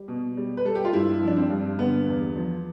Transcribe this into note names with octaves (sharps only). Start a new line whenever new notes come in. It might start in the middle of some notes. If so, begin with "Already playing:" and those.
Already playing: G3
B2
G3
B4
G3 A4
G4
F4
G2 E4
F3
D4
C4
G2
D3 B3
E2
F3